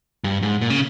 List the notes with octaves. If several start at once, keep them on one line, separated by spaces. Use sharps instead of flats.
G2
G#2
A#2
C#3